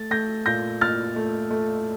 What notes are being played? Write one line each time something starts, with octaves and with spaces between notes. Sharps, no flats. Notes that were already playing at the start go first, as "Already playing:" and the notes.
Already playing: A3 A6
A3 G6 A#6
A#2 G6 A#6
A#2 F6 A6
A3
A3